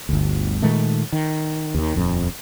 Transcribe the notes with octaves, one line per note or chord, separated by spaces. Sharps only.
G1 D2
A#2 D#3 G#3 A3
D#3
D#2 D#3
D#1 F2